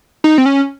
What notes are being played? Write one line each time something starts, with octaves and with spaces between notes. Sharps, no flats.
D#4
C4
C#4